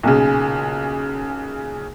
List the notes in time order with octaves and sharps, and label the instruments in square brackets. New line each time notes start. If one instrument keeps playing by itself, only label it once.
[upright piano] B1 A#2 C#3